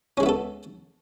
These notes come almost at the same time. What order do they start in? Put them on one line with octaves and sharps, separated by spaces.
C#4 G#3 E4 B3 A4